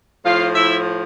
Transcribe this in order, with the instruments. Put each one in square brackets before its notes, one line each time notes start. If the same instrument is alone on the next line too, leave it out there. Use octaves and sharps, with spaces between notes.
[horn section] A2 F3 F4 F5
E4 E5